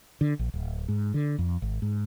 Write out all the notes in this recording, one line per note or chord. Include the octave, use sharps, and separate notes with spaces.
D3
A#1
D1
G#2
D3
F2
G#1
G#2